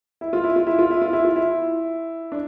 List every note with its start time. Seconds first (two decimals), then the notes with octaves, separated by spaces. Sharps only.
0.21 E4
0.33 F4
0.44 E4
0.56 F4
0.67 E4
0.79 F4
0.91 E4
1.02 F4
1.13 E4
1.25 F4
1.36 E4
2.32 D4